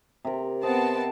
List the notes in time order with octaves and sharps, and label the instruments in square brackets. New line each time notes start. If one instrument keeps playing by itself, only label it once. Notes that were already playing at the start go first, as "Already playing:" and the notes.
[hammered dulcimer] C3 A#4
[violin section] B3 C4 A5 [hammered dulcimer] D#5